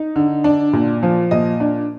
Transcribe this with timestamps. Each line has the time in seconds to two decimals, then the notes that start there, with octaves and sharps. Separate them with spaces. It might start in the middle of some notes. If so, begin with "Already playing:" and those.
Already playing: D#4
0.16 D3
0.44 D4
0.73 A#2
1.03 F3
1.31 A#2 D#5
1.60 D4